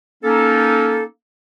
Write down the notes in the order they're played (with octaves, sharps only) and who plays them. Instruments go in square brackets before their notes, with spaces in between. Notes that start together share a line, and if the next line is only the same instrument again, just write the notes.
[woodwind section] A#3 C#4 D#4 A4